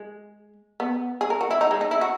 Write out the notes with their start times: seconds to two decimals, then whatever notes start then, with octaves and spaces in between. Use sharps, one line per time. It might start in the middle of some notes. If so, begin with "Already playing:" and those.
Already playing: G#3
0.80 B3
1.21 G#4
1.30 A#4
1.41 F#4
1.51 E4
1.61 D#4
1.71 G#3
1.81 D#4
1.91 E4
2.01 F#4